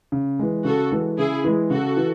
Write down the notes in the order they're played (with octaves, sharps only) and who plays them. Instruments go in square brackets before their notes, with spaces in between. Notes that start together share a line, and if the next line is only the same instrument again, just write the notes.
[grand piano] C#3
E3 G#3
[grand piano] C#3 [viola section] F#4 A4
[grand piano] E3 G#3
[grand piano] C#3 [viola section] E4 G#4
[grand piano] E3 G#3
[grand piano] C#3 [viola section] F#4 A4
[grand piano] E3